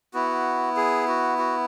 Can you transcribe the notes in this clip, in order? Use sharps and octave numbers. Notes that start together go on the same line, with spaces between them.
B3 E4 F#4
G#4
F#4
F#4